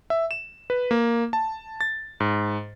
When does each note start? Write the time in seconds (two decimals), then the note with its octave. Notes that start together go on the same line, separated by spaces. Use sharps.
0.10 E5
0.31 E7
0.70 B4
0.91 A#3
1.33 A5
1.81 A6
2.20 G#2